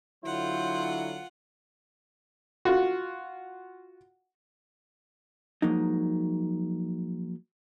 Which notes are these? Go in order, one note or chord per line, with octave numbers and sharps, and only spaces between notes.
D3 F#3 E4 F4 C5 F#5
F4 F#4
F3 F#3 G#3 A#3 D#4